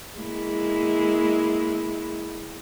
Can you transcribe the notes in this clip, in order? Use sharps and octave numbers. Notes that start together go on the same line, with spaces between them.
G#3 A#3 E4